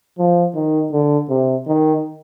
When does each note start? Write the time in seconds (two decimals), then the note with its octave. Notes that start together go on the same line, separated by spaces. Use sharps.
0.19 F3
0.55 D#3
0.92 D3
1.30 C3
1.67 D#3